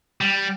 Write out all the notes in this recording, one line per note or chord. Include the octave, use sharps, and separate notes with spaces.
G3